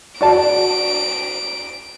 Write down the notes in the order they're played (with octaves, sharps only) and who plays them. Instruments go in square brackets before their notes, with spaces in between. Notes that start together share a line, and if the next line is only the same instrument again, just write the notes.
[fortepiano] F#4 D5 A5 [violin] D7